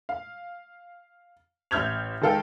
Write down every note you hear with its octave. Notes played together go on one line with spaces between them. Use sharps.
F5
A1 E5 F6 G6 G#6 F7
D#3 G#3 A4 F5 G5